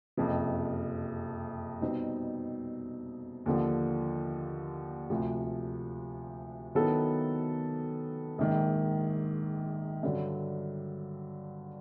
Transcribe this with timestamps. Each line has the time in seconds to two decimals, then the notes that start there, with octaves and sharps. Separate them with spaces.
0.17 F#1 F2 C3 F3
1.81 B2 G3 C4 D#4
3.46 D#2 D3 F3
5.10 D2 C3 F3
6.75 D#3 F#3 B3 E4 A4
8.38 A#1 G#2 D#3
10.03 G2 D3 F#3